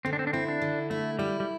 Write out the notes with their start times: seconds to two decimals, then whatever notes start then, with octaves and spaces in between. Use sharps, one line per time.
0.05 D3 C4
0.13 D4
0.19 C4
0.27 D4
0.33 C4 E4
0.48 D4
0.62 D3
0.90 A3 E4
1.19 G3 E4
1.40 G3